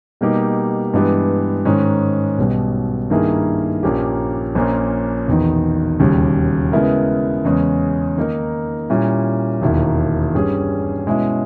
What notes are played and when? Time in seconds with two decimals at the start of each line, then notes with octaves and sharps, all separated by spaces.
0.21 B2 G3 A#3 D#4 G4
0.94 G2 E3 G#3 B3 G4
1.65 G#2 D#3 G#3 C#4
2.38 B1 B2 G3
3.10 G2 D#3 A#3 E4 G#4
3.83 A#1 A#2 A#3 C#4 G4
4.55 A#1 A#2 A#3 C#4
5.27 E1 E2 D#3
6.00 E1 D#2 C#3 G3
6.72 C#3 G#3 B3 E4 A#4
7.45 E2 C#3 G#3 C#4
8.17 D#3 A#3 D#4 A#4
8.90 A#2 G3 C#4 E4
9.62 E1 D#2 D#3 A#3 E4
10.34 G2 G3 C#4 G#4
11.07 B2 G#3 C#4 E4